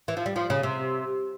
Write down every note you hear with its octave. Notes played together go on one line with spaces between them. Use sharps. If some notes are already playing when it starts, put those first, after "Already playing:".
E3
F3
G3
F3
C#3
C3